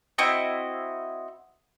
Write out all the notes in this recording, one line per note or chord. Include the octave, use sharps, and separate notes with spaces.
C4 E4 F#4 D#5